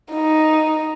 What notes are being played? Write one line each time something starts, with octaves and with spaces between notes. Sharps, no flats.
D#4